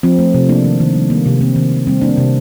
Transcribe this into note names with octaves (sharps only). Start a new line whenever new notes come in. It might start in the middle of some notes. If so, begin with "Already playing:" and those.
F3 C4
A3
C3
A#3 D4
D#3
D#3
G3
A#3
C3
A#3 C4
D#3
D#3
G3 C4
A#3 D4
C4
C3